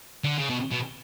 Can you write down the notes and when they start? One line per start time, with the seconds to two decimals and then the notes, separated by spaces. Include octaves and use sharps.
0.24 D3
0.38 C#3
0.50 B2
0.72 B2